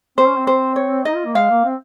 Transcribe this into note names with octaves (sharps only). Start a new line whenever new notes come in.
C4 C5
C#4
C4
C5
C#5
D#4 D#5
F4
A#3
G#3 F5
A#3
C4